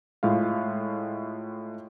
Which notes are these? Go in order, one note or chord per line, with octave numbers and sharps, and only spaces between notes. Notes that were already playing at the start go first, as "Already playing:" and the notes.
A2 G#3 F4 F5